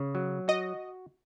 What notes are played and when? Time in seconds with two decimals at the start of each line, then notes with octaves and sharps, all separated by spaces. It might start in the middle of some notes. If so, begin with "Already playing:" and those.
Already playing: C#3
0.15 F#3
0.48 F#4 D#5